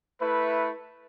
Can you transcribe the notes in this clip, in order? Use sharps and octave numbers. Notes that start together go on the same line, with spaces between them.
A3 E4 B4